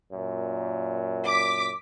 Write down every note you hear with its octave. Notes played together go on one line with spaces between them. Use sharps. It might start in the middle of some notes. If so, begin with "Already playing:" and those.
F#2 A#2
D6 B6